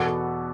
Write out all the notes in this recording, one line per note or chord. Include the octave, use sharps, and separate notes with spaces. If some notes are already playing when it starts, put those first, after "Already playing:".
Already playing: E2 B2 B3 F#4 A4